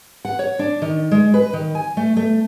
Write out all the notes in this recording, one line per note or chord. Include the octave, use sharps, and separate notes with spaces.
F#5
C#5
D4
D#3
G#3
B4
D#3
G#5
A3
A3